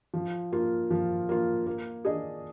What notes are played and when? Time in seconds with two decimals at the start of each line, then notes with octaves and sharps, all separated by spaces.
0.14 F3
0.52 A#3 F4
0.91 F3
1.29 A#3 F4
1.67 A#3
2.05 D4 G#4 D#5